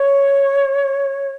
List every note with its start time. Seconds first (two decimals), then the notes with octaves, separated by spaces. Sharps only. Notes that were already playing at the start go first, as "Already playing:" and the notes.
Already playing: C#5